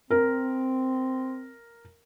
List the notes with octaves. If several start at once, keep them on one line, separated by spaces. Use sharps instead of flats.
C4 A#4